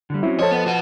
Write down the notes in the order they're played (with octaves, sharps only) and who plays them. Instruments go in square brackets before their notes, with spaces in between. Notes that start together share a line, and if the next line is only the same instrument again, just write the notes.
[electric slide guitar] D3 G3
[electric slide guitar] F#3 C4 C#4 [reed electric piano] E4
[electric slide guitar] F3 A5 [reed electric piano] A4 C5 D#5 [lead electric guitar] C#5
[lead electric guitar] B3
F#4 B4